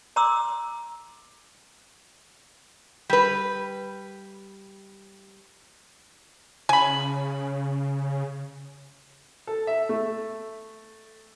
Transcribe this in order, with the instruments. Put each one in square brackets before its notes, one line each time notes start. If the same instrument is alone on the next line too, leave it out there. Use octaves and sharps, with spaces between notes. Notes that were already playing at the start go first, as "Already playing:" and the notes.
[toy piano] D5 A#5 C6 D6 E6
[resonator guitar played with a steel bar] G3 B4
[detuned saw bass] C#3 [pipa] G#5 B5
[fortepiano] A4
E5
A3